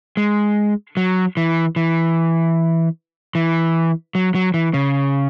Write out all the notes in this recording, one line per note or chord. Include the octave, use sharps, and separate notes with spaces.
G#3
F#3
E3
E3
E3
F#3
F#3
E3
C#3